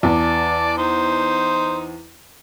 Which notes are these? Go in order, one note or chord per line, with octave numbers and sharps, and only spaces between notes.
E2 D5 A5
D#4 C5